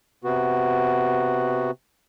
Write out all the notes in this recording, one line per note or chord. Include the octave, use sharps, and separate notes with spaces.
C3 B3 F#4